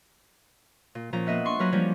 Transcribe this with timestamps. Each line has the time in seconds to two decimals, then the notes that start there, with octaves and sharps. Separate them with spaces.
0.95 A#2
1.13 A#2 F3 C#4 A#5
1.27 A#3 B3 D#5 E5 F#5
1.45 D4 C6 C#6
1.59 F#3 A#3 C#4 B4 A#5 F6
1.72 F3 G3 A#3 C#4 D4 C#5